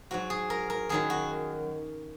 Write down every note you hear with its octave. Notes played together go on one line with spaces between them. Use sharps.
G#2 F#3 F#4
G#4
A#4
A#4
F#2 D#3 F#3 G#4
F#4